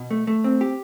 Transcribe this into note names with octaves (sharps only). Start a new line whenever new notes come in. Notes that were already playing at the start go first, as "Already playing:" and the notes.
Already playing: B2
A3
A3
C4
G4